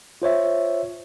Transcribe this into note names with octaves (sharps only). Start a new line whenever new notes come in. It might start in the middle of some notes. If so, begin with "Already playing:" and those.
F4 C5 C#5 E5